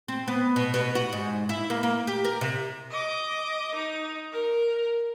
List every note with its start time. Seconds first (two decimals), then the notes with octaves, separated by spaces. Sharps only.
0.08 C4
0.28 B3
0.56 B2
0.74 B2
0.95 F#4
1.13 G#2
1.49 E4
1.70 A#3
1.83 A#3
2.07 G4
2.25 A#4
2.41 C3
2.91 D#5 D6
3.75 D#4
4.32 A#4